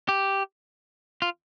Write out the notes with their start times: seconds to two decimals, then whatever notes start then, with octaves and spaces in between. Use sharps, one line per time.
0.09 G4
1.22 F4